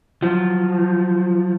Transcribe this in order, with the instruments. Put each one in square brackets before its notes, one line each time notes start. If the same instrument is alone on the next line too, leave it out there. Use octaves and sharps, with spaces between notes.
[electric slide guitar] F3 F#3